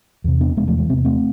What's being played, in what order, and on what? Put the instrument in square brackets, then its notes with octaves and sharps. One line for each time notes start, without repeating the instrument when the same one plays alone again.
[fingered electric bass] E2 C3
B3 D4
E2 C3 G#3 B3
F3 A3
E3 G#3
E2 C3 C4
B3
A3 C4